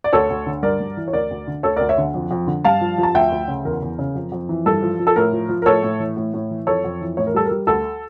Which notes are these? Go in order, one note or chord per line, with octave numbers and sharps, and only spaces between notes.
D5
D2 A4 C#5
D2
D3
G2 A#4 D5
G2
E3
C#5
D2 A#4 D5
D2
D3
D2 A4 C#5
D2 A#4 D5
C#5 E5
D3
F2
F2
D3
G2 F5 A5
F3
F3
A5
D2 E5 G5
D2
C#3
E2 A#4
E2
C#3
F2
F2
E3
G2 A4
F3
F3
A4
A2 A#4
F3
F3
A#4
A2 A4 C#5
A2
E3
A2
A2
E3
F2 A4 C#5
F2
E3
A2 C#5
A#4
G3 A4
A#4
G3
D2 A4